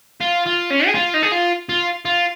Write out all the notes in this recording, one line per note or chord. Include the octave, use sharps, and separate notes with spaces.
F4
F4
C#4
G#4
F4
D#4
G#4
F4
F4
F4